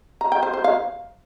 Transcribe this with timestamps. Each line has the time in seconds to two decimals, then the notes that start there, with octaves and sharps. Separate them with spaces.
0.21 A#5
0.32 G5
0.43 C5
0.54 C5
0.64 F5